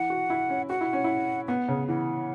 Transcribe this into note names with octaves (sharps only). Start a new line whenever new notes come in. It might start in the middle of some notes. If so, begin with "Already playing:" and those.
Already playing: E3 F#5
F#4
E4
C#4
F#4 F#5
E4
C#4
E4
B3 F#5
C#3
E3 F#5